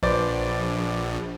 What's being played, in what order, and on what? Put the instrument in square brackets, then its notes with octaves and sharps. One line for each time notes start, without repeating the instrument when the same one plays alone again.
[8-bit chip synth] A#1 [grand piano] B4 C5 D5